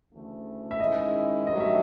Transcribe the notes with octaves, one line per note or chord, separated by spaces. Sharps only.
D2 C#3 E3 A3
E5
G#2 D#3 G#3 C#4 E4 D#5
G2 D#3 F#3 A3 D#5
E5